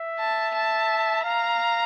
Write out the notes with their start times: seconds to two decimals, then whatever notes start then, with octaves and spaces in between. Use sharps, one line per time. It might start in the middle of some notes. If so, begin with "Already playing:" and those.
Already playing: E5
0.19 A5
0.54 A5
1.25 F5 A#5